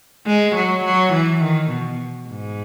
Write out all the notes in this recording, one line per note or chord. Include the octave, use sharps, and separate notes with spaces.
G#3
F#3
F#3
E3
D#3
B2
G#2